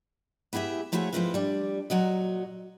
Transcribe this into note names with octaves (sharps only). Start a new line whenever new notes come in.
B3 E4 G4 G#4 E5
F3 A3 E4 F#4 G#4 C#5
F3 G#3 C4 E4 F4 B4
G3 D4
A#2 F#3 F#4 D#5